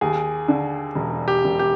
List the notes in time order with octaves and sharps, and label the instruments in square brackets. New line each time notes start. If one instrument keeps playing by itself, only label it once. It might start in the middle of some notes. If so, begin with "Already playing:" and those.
[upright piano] D#2 [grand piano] G#4
[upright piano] D3
E1
[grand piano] G4
[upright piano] E1
[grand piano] G4